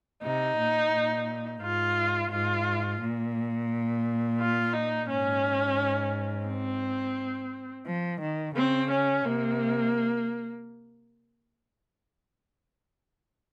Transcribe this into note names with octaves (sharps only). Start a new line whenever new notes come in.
C3 D#4
A#2
A#2
G#2 F4
G#2 F4
A#2
F4
D#4
G#2 C#4
C4
F3
D#3
C#3 C4
C#4
C3 A#3